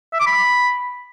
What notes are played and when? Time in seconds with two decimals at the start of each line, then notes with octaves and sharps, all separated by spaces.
0.13 E5
0.20 D6
0.27 B5